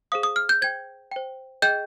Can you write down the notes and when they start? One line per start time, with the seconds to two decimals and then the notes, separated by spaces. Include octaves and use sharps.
0.12 G#4 C5 F5 D#6
0.23 D#6
0.36 F6
0.49 G6
0.62 C5 G5 G#6
1.11 C5 G5
1.62 G#4 D#5 G5 G6